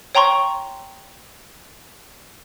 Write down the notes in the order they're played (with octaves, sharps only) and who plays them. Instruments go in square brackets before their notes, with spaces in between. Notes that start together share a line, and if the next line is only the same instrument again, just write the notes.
[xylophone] C#5 G5 A#5 C6 C#6